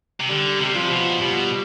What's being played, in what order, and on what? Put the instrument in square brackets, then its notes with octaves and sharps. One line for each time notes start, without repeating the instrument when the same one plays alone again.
[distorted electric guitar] C3
[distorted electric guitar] D3 [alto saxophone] G3
[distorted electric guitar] C3 [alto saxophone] G3
[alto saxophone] F3
[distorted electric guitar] B2
[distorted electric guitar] B2 [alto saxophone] G3